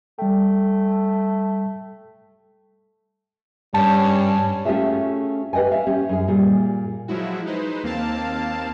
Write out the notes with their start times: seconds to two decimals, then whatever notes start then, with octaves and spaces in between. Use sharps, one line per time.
0.19 G3 A3 G5
3.74 G2 G3 C#4 A5
4.65 A3 C#4 F4 G4 G#4 E5
5.53 G4 B4 D#5 G5 G#5
5.71 E5 F5
5.87 C#4 G4
6.09 F#2 G#4
6.28 A#2 G3 G#4
7.08 F3 F#3 G#3 E4 F#4
7.46 G#3 D#4 B4 C5
7.84 D#2 A#3 C4 F5 A5